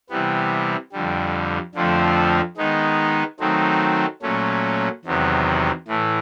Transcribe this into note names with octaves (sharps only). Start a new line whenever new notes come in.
C3 E3 G3 B3
F2 D3 G3
F2 D3 F3 A3 C4
D#3 G#3 B3 D#4
D#3 F#3 A3 C4 D#4
A#2 F#3 A3 C#4
E2 C3 D#3 F#3 B3
A2 E3 A3